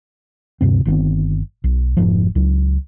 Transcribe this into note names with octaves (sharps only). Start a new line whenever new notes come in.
D2 G2 C3 C4
G1 D#3 B3 C4
B1
F1 C2 G#2 F3
C#2 F#3